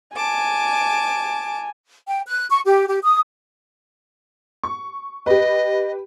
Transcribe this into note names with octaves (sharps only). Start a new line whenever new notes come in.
G#5 A5 D6
G5
F#6
C#6
G4
G4
D#6
C#6
G4 B4 D#5